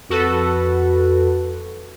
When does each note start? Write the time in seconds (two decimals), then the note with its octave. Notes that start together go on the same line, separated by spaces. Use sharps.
0.09 F2 F#4 A4 B4